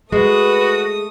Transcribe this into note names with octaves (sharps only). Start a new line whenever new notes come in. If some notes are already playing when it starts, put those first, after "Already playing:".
G#3 A3 F#4 B4 D#6